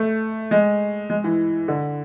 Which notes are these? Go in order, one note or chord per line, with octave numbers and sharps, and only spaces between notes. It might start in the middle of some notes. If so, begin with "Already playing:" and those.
Already playing: A3
G#3
G#3
E3
D3